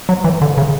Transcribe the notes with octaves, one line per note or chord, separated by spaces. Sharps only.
F#3
E3
D3
C#3